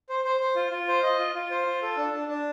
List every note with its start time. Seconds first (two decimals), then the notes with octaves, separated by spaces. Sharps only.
0.09 C5
0.25 C5
0.40 C5
0.56 F4
0.71 F4
0.88 C5
1.03 D#5
1.19 F4
1.35 F4
1.51 C5
1.67 F4
1.82 A4
1.97 D4
2.13 D4
2.28 D4